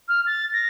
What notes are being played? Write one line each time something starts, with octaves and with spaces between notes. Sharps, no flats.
F6
A6
A#6